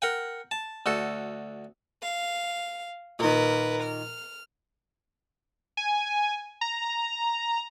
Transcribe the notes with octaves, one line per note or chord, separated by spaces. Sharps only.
A#4 F#5 G5
A5
D2 F#4 A4
F5
A#2 D#3 A#4 B4
F6
G#5
A#5